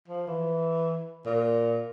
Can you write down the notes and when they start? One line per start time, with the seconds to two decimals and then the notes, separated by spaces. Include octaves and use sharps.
0.08 F3
0.27 E3
1.26 A#2